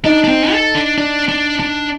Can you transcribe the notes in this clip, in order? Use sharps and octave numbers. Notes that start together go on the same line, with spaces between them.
D4 D#4
D4
C4
A4
D4
D4
D4
D4